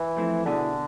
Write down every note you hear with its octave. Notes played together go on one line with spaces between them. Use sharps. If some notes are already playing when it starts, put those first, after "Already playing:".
Already playing: E3
F3 A3 C4 E4
B2 D3 B3 E4 G#4